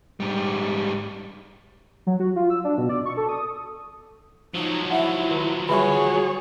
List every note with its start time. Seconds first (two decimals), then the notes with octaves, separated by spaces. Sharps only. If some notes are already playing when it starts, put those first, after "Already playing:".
0.20 G#2 G3
2.07 F#3
2.20 F#4
2.36 F4
2.50 E6
2.64 D4
2.78 B2
2.89 D5
3.05 C#6
3.17 A4
3.29 D#6
4.54 F3 F#3 D#4
4.91 E4 E5 F#5
5.30 D#3
5.69 D3 G3 F#4 G#4 C#5